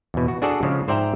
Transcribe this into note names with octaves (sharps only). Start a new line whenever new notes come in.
E2 B2
F#4
D4 F#4 G#4 A4 D5
C#3 F3 G#3
G#2 C5 D5 E5 G5 A#5